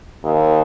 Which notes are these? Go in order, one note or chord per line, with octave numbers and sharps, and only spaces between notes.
D#2